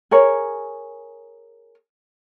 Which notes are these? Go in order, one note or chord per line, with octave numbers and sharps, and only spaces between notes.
G#4 A#4 C#5